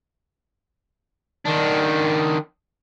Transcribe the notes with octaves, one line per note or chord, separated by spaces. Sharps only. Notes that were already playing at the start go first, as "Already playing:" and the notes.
D#3 D4